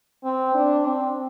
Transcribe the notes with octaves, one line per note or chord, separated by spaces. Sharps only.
C4
D4
C4